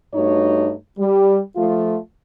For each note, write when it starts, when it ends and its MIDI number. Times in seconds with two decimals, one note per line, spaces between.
0.14 0.72 43
0.14 0.72 57
0.14 0.72 63
0.14 0.72 66
0.14 0.72 73
0.99 1.40 55
1.56 1.97 53
1.56 1.97 57
1.56 1.97 65